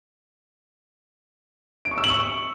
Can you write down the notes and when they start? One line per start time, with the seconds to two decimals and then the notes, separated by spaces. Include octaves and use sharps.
1.85 D7
1.91 C#6
1.98 E6
2.04 F#7
2.10 C#6